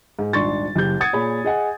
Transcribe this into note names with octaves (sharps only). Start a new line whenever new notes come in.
G#2
D#1 G#1 D4 C6 C#6 A6
F#1 G4 G6
F#5 D#6 G#6 A6 C#7
A#2 G#4 C#5 B5
G#4 D#5 F#5 G#5